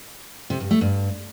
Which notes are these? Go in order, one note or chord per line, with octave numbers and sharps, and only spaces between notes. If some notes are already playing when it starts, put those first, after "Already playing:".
C3
G2
A3
G2